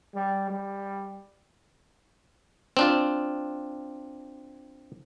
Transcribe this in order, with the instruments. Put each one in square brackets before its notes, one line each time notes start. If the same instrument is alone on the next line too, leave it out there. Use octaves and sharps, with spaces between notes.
[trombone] G3
G3
[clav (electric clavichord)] C4 D4 F4